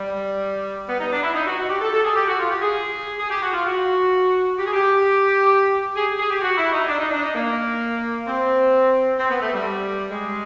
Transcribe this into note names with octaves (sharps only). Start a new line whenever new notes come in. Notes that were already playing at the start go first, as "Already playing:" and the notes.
Already playing: G3
B3
D#4
D4
E4
D#4
F#4
F#4
G4
A4
A4
G#4
G4
F#4
F4
G4
G#4
G#4
G4
F#4
F4
F#4
G4
G#4
G4
G#4
G#4
G4
F#4
E4
D#4
D4
D#4
D4
D#4
A#3
C4
C4
B3
A3
G3
G#3